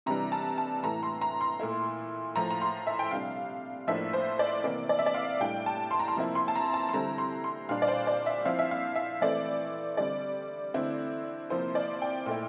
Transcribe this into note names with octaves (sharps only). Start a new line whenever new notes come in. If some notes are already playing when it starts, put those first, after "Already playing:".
C3 E3 G3 D4 A#5
A5
A5
A2 E3 A3 A#5
C6
A#5
C6
A#2 A3 E4
A2 F3 A3 A#5
A#5
C6
E5
G5
C3 G3 D4 F5
A2 F3 A#3 D4 E5
C5
D5
C3 E3 A#3 D5
D5
E5
D5
F5
A2 G3 D4 G5
A5
C6
A#5
C6
C3 F3 A#3 E4
C6
A5
A#5
A5
C6
D3 G3 C4 E4 A#5
C6
C6
A#2 G3 D4 F5
D5
C5
D5
E5
F3 C4 E4 F5
E5
F5
E5
E3 A3 C4 E4 D5
D3 G3 C4 D5
D3 A3 C4 E4
C3 F3 A#3 E4 C5
D5
G5
A#2 A3 E4